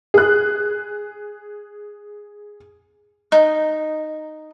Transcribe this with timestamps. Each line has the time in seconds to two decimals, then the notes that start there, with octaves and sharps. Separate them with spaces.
0.14 G#4 F#6
3.32 D#4